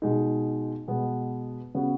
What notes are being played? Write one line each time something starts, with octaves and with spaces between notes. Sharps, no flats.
B2 G#3 D#4
B2 G#3 B3
C#3 B3 F#4